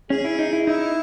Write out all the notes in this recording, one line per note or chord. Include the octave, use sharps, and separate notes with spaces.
C#4 G#4
E4
D#4
E4
D#4 E4